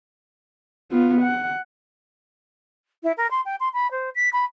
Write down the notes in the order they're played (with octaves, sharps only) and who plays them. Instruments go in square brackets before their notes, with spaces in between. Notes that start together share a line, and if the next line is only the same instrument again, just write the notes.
[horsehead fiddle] B3 F4
F#5
[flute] E4
A#4
C6
G5
C6
B5
C5
B6
B5